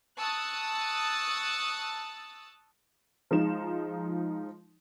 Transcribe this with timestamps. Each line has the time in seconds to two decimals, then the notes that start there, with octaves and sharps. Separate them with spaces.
0.16 A5 C#6 D#6 E6 F#6 A6
3.31 F3 G#3 D#4 E7